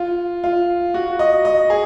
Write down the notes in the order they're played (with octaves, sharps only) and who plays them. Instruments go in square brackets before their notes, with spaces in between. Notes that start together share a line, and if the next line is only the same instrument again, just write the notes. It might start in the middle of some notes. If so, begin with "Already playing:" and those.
Already playing: [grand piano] F4
F4
F#4
D#5
D#5
G#4